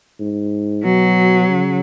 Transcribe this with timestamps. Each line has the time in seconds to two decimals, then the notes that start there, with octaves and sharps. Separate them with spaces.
0.20 G#2
0.84 B2 F#3
1.50 C#3